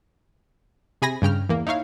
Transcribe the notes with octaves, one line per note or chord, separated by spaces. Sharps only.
C3 G#4 G#5 B5 A#6
G2 C#3 G5 F6
E2 A#3
D#4 E4 C#5 F5